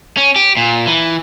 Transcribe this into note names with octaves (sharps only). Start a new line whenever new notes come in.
C#4
G4
A#2
E3